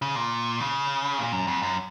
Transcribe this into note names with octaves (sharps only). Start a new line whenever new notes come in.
C#3
A#2
C#3
A#2
F#2
F2
F#2